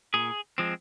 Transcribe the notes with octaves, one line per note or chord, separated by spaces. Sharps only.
A#2 G#4
F3 G#3 C4